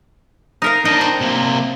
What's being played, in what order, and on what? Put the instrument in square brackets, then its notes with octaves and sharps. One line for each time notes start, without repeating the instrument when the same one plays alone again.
[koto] D#4 A#4 F5
[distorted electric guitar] D4 D#4 [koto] D#5 G5
[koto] C5
[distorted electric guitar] C3 A#3